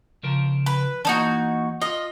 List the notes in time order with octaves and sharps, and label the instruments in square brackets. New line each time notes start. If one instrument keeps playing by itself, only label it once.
[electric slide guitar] C#3 F3 A#4
[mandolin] B4
[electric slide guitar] E3 A#3 [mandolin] D4 D#4 F#4
[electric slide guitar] F4 [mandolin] D#5